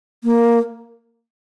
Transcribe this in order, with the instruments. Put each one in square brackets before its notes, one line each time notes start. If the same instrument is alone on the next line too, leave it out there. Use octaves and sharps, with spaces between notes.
[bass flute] A#3